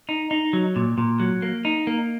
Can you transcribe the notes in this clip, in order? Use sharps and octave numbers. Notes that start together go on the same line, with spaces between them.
D#4
D#4
F#3
A#2
A#2
F#3
A#3
D#4
A#3